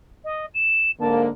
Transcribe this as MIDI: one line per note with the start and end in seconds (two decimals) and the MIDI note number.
0.24 0.46 75
0.54 0.90 100
1.00 1.29 44
1.00 1.29 50
1.00 1.29 58
1.00 1.21 81